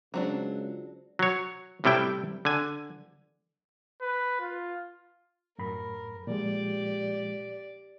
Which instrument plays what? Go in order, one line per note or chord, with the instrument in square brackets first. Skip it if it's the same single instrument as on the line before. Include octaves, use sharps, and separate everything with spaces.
[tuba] C#2 [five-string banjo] F#3 C4 D4
[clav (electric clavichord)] F#3 C#5
A2 C3 G3 E4 G5
D3 G#5
[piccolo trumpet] B4
F4
[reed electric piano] F#2 A2 B5 [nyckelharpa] A#4
[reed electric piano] A#2 F3 G#3 [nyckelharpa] G4 D5